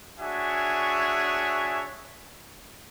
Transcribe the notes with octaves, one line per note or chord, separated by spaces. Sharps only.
D4 F#4 G#4 C#5 E5 G#5